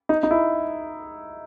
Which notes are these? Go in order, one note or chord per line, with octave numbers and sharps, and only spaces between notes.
D#4
D#4
E4